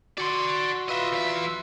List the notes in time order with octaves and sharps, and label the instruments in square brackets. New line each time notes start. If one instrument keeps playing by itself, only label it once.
[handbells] F#4 C6 [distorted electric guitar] D5 F#5
[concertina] F4 B4 E6 [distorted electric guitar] D#5 E5
[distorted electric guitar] E2 E5